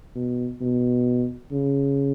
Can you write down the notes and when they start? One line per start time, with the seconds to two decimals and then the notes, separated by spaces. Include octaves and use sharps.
0.15 B2
0.61 B2
1.52 C#3